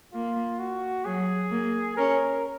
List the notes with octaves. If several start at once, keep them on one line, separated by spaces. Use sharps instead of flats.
A#3 F4
F#4
F#3 G#4
A#3
C#4 A#4